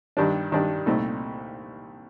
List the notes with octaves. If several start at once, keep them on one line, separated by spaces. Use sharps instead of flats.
G2 D#3 G3 D4
G2 D#3 G3 D4
C2 A#2 A3 C4 D#4